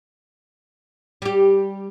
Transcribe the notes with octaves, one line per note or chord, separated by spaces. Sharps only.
G3 G4